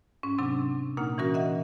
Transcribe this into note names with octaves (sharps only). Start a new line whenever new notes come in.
G#2 C#4
C3 F#3 C4 D4
A#2 A#3 D#4 F#5 F6
E3 C#4 F#4 A#4
D#5 E5 F#5